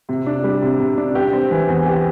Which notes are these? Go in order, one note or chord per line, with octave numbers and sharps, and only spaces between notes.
C3
D4
G3
C3
C3
D4
G4
C4
E3
E2
G4